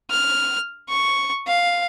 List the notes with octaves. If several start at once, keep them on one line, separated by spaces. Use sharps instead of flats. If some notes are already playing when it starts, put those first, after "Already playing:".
F6
C#6
F5